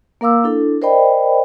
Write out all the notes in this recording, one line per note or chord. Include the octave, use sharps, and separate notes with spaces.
A#3 A#4 F5 D6 E6
D4 E4 A4
A#4 C5 D5 D#5 G5 B5